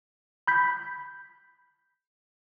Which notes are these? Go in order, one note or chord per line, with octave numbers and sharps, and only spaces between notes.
B5 G6 B6